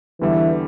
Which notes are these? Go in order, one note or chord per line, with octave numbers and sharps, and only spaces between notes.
E2 D3 E3 G3